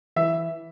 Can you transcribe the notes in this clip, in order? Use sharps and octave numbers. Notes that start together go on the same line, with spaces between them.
E3 E5